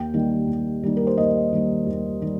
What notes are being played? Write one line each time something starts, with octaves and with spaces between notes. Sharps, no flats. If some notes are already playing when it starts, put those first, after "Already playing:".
Already playing: D#2 G5
D#3 G3 A#3 D#4
D#2
D#3 G3 A#3 D#4
A#4
C5
D#2 D#5
D#3 G3 A#3 D#4
D#2
D#3 G3 A#3 D#4